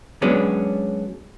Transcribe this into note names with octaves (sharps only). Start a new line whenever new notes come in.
F#3 G#3 B3 C#4 D4